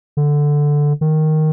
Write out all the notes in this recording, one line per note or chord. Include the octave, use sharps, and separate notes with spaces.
D3
D#3